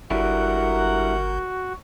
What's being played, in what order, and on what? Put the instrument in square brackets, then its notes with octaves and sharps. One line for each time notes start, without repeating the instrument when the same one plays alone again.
[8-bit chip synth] G1 [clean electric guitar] D3 G3 E4 [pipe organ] F#4 [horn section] A#4 F#5